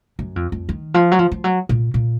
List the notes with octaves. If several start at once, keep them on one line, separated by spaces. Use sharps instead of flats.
F#2
F2
F2
D#3
F3
F#3
F3
F3
F#3
A#2
A#2